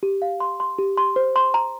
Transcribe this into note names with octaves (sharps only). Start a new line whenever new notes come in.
G4
F5
C6
C6
G4
C6
C5
C6
A#5